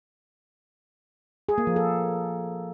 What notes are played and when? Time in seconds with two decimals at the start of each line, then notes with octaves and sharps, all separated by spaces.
1.49 G#4
1.58 A#3
1.67 F3
1.76 A4